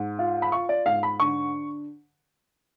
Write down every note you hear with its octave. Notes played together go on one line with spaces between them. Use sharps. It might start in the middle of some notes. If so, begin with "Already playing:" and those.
Already playing: G#2
F4
B5
F4 C#6
D5
G#2 F5
B5
D3 C#6